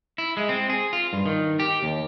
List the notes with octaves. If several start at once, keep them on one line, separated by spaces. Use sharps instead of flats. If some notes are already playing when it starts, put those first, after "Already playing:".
E4
G#3
C4
G#4
F4
G2
D#3
G4
D#2